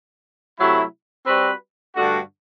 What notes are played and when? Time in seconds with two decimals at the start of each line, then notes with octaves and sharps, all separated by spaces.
0.58 C3 F#3 A3 E4
1.27 G3 C4 F#4 B4
1.95 G2 D3 A3 D4 F#4